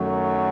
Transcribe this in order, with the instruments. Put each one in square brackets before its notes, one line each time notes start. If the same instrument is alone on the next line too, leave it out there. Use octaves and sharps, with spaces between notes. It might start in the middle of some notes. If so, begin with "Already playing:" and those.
Already playing: [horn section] F#2 D#3 F#3 A3